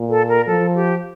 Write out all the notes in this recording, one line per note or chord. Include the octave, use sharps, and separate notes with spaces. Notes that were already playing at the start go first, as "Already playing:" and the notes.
Already playing: A#2
A4
A#4
F3 A4
G4